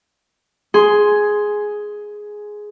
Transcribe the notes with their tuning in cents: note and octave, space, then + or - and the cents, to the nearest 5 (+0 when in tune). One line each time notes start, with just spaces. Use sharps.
G#4 +5 C6 +0